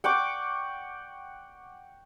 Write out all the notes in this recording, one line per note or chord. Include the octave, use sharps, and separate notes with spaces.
F#5 G5 C#6 D6